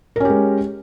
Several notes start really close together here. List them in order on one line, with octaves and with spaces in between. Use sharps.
A#4 C#4 G4 G#3